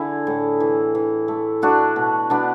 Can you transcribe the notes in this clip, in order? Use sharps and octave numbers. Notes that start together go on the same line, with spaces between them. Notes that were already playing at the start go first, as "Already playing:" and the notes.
Already playing: D3 E4 G#4
A2
E3
E3
A3
A3 D4 F#4
B2
B2 B3 D4